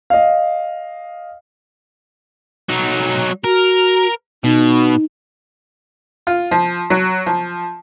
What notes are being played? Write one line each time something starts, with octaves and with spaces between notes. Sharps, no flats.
D#5 F5
F#3 D#4
F#4 A#4
B2 D#4
F4
F3
F#3
F3